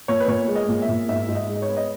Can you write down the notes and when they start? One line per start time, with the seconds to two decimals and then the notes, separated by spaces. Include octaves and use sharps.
0.08 A#2 C#5
0.20 B4
0.28 A#2 C#5
0.48 G#3
0.55 D#5
0.68 A#2
0.82 E5
0.89 A#2
1.09 G#2 E5
1.28 G#2
1.35 D#5
1.49 G#3
1.55 D#5
1.62 C#5
1.69 B3
1.77 D#5